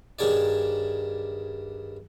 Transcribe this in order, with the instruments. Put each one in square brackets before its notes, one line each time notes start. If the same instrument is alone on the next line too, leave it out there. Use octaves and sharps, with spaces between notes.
[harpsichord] G2 D#3 G#4 C#5 D5